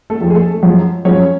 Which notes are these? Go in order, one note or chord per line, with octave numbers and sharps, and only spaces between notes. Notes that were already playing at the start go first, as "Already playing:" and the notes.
A3 A4
F2 F3 G#3
G#4
A3 A4
F#2 F3 G#3
F#2 F3 G#3 C#4 C#5